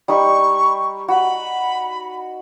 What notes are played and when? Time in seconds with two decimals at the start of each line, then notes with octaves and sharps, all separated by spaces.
0.08 G3 D#4 B5 C#6
1.08 F#4 B5